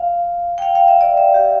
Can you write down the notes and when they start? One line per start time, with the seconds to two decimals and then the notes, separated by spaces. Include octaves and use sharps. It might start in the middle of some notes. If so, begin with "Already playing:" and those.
Already playing: F5
0.58 G5
0.62 F5
0.75 F5
0.88 E5
1.01 D5
1.17 E5
1.34 G4